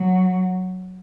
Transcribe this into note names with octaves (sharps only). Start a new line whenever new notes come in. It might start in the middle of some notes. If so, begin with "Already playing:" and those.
Already playing: F#3